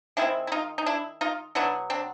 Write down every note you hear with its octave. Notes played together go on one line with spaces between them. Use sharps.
D#3 G#3 C4 D4 E4
E4
D#4 F4
D#4
D4 E4
D#4 F4
B2 F#3 B3 D4 E4
C4 D4